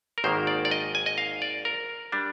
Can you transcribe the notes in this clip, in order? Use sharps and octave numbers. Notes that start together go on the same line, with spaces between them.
A#4
G#1 G#2 D#3 A#3 C5
D5
D5
D#5
G#5
D#5
F5
D5
A#4
G3 D4